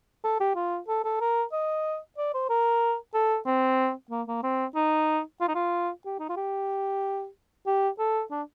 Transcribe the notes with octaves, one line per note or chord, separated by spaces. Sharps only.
A4
G4
F4
A4
A4
A#4
D#5
D5
C5
A#4
A4
C4
A#3
A#3
C4
D#4
F4
D#4
F4
G4
D#4
F4
G4
G4
A4
D4